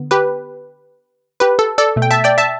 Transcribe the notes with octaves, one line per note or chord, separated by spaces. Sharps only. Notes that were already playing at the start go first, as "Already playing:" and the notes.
Already playing: D3 B3
G4 B4
G4 B4
A4
A4 D5
B2 A3
G5
E5 A5
D5 G5
E5 A5